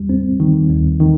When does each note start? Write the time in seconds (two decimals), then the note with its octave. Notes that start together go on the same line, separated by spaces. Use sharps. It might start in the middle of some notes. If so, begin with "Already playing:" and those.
Already playing: D#2 G3
0.09 C4
0.40 D#3
0.71 D#2
1.00 D#3